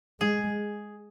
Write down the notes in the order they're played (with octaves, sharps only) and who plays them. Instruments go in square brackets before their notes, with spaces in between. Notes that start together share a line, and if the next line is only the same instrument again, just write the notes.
[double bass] G#3 [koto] G#4